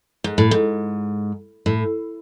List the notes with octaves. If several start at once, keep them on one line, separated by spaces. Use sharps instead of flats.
G#2
A2
G#2
A2